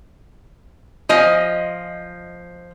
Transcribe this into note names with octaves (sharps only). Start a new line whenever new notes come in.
F3 D#5 G#5